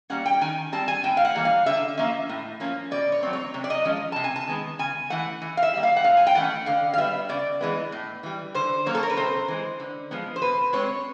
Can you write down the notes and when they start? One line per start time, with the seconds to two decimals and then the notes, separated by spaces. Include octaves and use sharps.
0.10 G3 A#3 C#4 F#5
0.26 G5
0.41 D#3 G#5
0.72 G3 C4 A5
0.88 G#5
1.04 A2 G5
1.17 F5
1.25 F#5
1.35 E3 G3 A#3
1.45 F5
1.66 D3 E5
1.97 F3 A#3 C#4 E5
2.29 A2
2.60 F3 A#3 C#4
2.91 B2 D5
3.12 C#5
3.23 F#3 A3 C4
3.33 C#5
3.54 C3
3.64 D5
3.70 D#5
3.85 F3 G#3 C#4
4.12 C3 A5
4.24 G#5
4.36 A5
4.47 D#3 G#3 B3
4.79 C#3 G#5
5.10 E3 A3 F#5
5.42 E3
5.57 F5
5.63 E5
5.73 G3 A#3
5.83 F5
5.96 F#5
6.04 A2 F5
6.17 G#5
6.27 G5
6.35 E3 A3 C#4 F#5
6.66 D3 F5
6.94 F5
6.98 G3 B3 E5
7.29 C#3 D5
7.61 E3 G#3 B3
7.92 A2
8.23 E3 G3
8.54 D3 C5
8.86 F#3 A#3 C#4 C#5
8.95 A4
9.03 A#4
9.09 B4
9.17 C3 C5
9.48 E3 G#3
9.80 D3
10.11 F3 G#3 B3
10.36 C5
10.42 B2 B4
10.73 G#3 C4 C#5